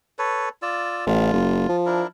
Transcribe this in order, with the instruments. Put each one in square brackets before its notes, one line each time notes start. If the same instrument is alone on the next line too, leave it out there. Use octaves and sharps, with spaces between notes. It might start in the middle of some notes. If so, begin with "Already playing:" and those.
[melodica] A4 B4 C#5
F4 D5 E6
[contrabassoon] A1 [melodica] F4
[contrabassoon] F#1
F3
[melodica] D4 E4 A#4